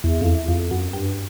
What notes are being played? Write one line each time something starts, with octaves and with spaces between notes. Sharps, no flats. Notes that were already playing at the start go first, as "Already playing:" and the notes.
E2
F2
E2
F2
F#2
G2